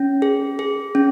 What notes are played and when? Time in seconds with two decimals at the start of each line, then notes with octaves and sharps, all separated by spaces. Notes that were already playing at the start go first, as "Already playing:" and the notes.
Already playing: C#4
0.22 G#4
0.59 G#4
0.95 C#4